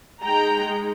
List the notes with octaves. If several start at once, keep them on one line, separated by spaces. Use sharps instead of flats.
G#3 D#4 G5 A#5